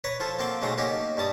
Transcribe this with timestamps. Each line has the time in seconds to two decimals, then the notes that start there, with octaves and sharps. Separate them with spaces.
0.04 B4 C#5 A#5
0.20 F3 F4 A4
0.39 A#3 C4 F#4 F5 G5
0.62 B1 C#3 A3 F4 F#5 A#5
0.78 A#3 C#4 D#4 F#4 G4
1.17 G2 G3 A5 D#6